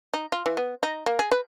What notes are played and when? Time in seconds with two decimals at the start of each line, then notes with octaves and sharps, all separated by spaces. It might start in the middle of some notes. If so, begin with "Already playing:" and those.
0.14 D#4
0.32 F4
0.46 E3
0.57 B3
0.83 D#4
1.06 A#3
1.19 G#4
1.31 B4